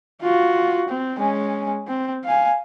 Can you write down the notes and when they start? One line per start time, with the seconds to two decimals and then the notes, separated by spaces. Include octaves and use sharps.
0.21 F4 F#4
0.89 C4
1.19 G#3 C#4
1.87 C4
2.24 F5 G#5